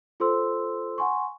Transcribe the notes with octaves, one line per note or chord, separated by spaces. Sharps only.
F4 A4 C5 C6 E6
F#5 G#5 C6 C#6